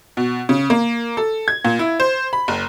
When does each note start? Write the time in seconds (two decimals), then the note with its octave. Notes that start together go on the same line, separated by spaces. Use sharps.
0.17 B2
0.49 C#3
0.70 A#3
1.17 A4
1.48 G#6
1.65 A#2
1.79 E4
2.00 C5
2.33 B5
2.48 F#1